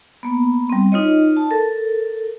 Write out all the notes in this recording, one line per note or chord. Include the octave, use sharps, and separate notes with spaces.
A#3 B3
G3 C4
D#4 F4 C#5 D#5
A5
A4 A#4